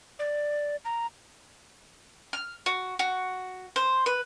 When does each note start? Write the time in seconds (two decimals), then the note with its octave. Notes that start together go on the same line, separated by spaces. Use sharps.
0.19 D5
0.85 A#5
2.33 F6
2.66 F#4
2.99 F#4
3.76 C5
4.06 B4